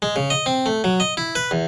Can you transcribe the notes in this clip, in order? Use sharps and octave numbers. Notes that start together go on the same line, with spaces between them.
G#3
C#3
D#5
C4
A3
F#3
D#5
E4
B4
E2